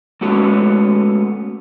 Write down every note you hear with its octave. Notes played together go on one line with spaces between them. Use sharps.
G#3 A3 B3 C#4 F#4 A4